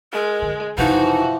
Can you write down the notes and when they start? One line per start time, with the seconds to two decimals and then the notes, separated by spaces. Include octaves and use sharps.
0.13 G#3 A#4
0.42 D3
0.78 F#1 C3 E3 F3 D#4 F#4